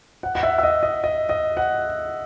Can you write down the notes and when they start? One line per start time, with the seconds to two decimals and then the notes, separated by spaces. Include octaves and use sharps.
0.23 F#5
0.35 F#5
0.43 E5
0.58 E5
0.63 D#5
0.83 D#5
1.04 D#5
1.29 D#5
1.57 F#5